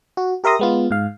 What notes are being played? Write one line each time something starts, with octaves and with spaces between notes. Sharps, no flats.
F#4
G4 A#4 E5 C6 D#6 A#6
G#3 B3 F4
G#2 F5